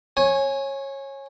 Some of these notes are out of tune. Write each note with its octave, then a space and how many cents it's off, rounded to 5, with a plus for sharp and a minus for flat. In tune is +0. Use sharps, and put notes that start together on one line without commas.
C#5 -20 G#5 +0